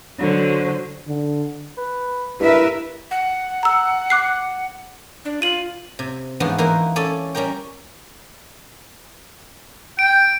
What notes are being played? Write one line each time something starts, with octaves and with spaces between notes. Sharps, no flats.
D3 F#3 C5
D3
B4
G2 E4 A#4 B4 E5
F#5
A#5 E6
D6 F#6 C7
D4
F4 D#7 F#7
C3
G#2 E3 F3 B3 D4 F#4
E3 A#3 D#4 A#4 C5
C#4 A4 C#5 D5 G#5
G3 C#4 G4 A#4 G5
G5 D7